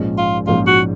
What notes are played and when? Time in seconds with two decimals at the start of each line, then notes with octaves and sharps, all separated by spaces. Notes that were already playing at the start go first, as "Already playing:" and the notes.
Already playing: A#1 G#2 F3 G#3 C#4
0.18 F4
0.47 A#1 G#2 F3 G#3 C#4 F4
0.67 F#4